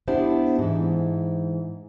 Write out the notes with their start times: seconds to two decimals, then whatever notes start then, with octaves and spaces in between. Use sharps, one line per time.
0.08 B3 D4 E4 G4 C5
0.59 G#2 E3